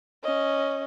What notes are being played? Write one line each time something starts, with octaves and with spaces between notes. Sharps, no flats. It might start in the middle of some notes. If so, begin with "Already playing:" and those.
C#4 D#5